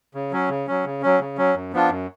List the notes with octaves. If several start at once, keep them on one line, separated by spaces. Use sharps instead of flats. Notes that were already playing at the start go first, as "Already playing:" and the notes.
C#3
F#3 C#4
C#3
F#3 C#4
C#3
F#3 C#4
C#3
F#3 C#4
F#2
F3 B3 D4 F4
F#2